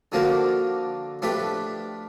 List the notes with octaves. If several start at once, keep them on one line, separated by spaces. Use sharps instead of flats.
D3 F3 A#3 D4 F#4
F3 A3 D4 G4 B4